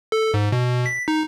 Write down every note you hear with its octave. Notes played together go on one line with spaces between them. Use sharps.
A4
G#2
B2
B6
D#4